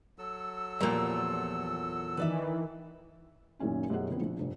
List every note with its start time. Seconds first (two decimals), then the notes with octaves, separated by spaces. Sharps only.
0.19 F#3 A4 E6
0.80 E2 A#2 F3 G3 A#4
2.17 D#3 E3 B4 D5 E5
3.59 F#2 A#2 D#3 C#4 E4
3.90 F#2 B2 G4 G#4 F#5
4.09 D3 F3 B3 C4
4.21 A#1
4.39 F1 G2